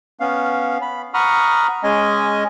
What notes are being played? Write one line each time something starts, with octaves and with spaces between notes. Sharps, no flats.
B3 C#4 F5
B5
F#5 A#5 B5 C#6 D#6 F6
G#3 C#4 D#5 G#5